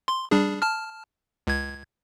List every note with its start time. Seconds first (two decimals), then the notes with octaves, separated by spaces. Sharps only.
0.08 C6
0.31 G3 D4 G#4
0.62 A5 F6
1.47 C#2 G#6